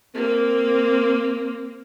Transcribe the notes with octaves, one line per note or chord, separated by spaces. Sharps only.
A#3 C4